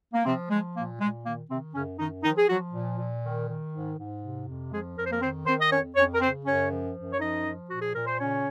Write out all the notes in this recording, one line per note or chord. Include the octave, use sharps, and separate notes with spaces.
A#3
C3 F3 C4
F3 G#3
A#2 A#3
A#2 G#3
D#3 A#3
C3 D#3 C4
F#2 C#3 C#4
F#2 D#3 D#4
D#3 F3 D#4
G#4
F3 F#3 F#4
A#2
A#2
D#3
D#3
G#2
G#2
C3
F2
F3 G#3 G#4
F2 A#4
C5
A#3 A#4
D#3 C4 C5
D#3 C4 C5
D#5
F2 C#4 C#5
F2 C#4 C#5
A#4
C#3 C4 C5
F#2 C#4 C#5
F3
F#2
C#5
F3 D#4 D#5
F3
A#2 F#4
G#4
A#2 A#4
C5
C#3 C#4 C#5